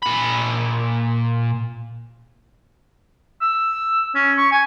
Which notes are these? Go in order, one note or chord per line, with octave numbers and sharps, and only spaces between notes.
A#2 B5
E6
C#4
C#6
G#5